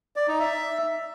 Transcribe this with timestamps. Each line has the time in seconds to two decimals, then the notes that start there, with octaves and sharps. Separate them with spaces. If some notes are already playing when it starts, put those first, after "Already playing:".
0.16 D5
0.28 D#4
0.40 E5